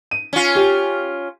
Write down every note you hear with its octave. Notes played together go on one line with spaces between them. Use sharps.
D#7
C#4 F4
G4